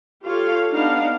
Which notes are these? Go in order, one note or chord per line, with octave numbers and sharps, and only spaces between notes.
F4 G4 A4 C#5 F5
B3 D4 D#4 F5 F#5